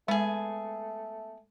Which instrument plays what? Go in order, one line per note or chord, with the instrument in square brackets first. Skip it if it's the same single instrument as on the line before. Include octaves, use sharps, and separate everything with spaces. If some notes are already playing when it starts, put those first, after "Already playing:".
[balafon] G#3 [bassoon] A3 [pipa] B3 G#4